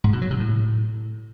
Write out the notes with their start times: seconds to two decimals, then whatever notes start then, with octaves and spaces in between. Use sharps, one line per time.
0.04 G#2
0.13 B2
0.22 F#3
0.31 C3
0.39 A2